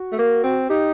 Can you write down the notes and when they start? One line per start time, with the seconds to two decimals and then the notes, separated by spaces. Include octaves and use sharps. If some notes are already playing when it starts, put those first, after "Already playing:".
Already playing: F#4
0.12 A3
0.19 A#3
0.44 C4
0.69 D#4 G4